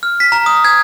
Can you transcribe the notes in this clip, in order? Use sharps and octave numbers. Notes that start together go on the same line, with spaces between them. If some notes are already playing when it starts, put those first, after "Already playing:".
F6
B6
A#5
D#6
G#6